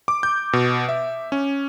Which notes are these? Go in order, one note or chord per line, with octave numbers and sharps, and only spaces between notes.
D6
G6
B2
E5
C#4